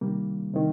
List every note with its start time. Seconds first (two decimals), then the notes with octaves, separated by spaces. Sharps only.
0.01 C3 D#3 G3 A#3
0.54 C3 D#3